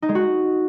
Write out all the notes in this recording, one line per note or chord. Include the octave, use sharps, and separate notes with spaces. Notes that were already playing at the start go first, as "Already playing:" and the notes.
D#4
G#3
F#4